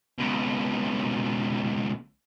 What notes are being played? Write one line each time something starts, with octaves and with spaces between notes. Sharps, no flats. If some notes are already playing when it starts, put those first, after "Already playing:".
C#2 B2